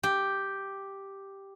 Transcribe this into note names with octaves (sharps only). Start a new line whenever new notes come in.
G4